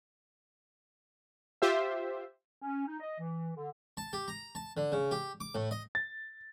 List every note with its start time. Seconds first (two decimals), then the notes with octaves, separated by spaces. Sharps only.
1.62 F4 G4 C5 E5
2.62 C#4
2.87 D#4
3.00 D#5
3.20 E3
3.56 D3
3.97 A5
4.13 G4
4.28 A#5
4.55 A5
4.77 D3
4.92 C#3
5.11 G4
5.40 D6
5.55 A2
5.71 D#5
5.95 A6